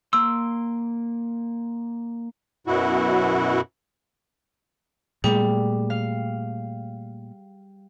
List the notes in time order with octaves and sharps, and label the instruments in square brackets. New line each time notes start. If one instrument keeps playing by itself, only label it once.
[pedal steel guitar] A#3 C6 [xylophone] E6
[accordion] F#2 B2 E4 F#4
[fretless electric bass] A#2 A3 B3 [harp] G3 [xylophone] G#4
[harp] F5